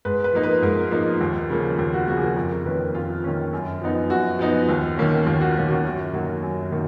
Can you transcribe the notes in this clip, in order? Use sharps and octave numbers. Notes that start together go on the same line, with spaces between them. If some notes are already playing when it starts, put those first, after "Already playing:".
G#2 B4
B4
F3 A#3 D#4
B4
G#2 A#4
F3 A#3 D#4
D#2
C#3 F3 A#3
D#2 A#4
F#4
C#3 F3 A#3 F#4
G#4
F#4
F2 A#4
D#3 A#3 C#4 B4
F2 F4
D#3 A#3 C#4
F#2
F3 B3 D#4
F#2 F#4
F3 B3 D#4
D#2
D#3 A#3 C#4
D#2 F4
F#4
D#3 A#3 C#4 F4
F#4
F#2 F#4
D#3 F#3 A#3 F#4
F#2
D#3 F#3 A#3